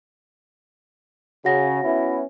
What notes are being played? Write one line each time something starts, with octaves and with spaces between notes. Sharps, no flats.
C#3 F#4 F#5 A#6
B3 C#4 E4